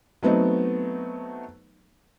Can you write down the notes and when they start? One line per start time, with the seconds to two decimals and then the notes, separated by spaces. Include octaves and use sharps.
0.23 F#3 A3 B3 C4 D#4